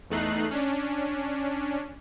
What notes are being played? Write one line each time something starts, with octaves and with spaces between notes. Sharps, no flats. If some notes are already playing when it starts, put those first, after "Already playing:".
E2 A3 D#4 F#6 C7
C#4 D4